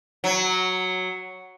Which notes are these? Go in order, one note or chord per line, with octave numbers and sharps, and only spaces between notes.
F#3